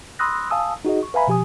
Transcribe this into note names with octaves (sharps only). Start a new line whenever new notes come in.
B5 C6 D#6 E6 F#6 A#6
F5 G#5 A5 D#6 E6
D#4 F#4 G#4 D#5
C#6
B4 E5 F5 G#5 A#5 B5
B2 F3 G4 G#5 D#6